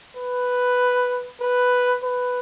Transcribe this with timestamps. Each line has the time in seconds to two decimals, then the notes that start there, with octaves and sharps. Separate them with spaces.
0.17 B4
1.41 B4
2.03 B4